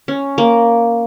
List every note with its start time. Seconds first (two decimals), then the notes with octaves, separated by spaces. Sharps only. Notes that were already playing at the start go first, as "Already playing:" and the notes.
0.08 C#4
0.38 A#3